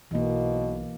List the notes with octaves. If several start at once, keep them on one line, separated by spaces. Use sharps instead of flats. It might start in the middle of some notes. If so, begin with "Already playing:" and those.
B1 B2 E3 A#3